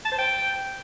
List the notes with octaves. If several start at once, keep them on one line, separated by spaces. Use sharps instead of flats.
A5
C5
G5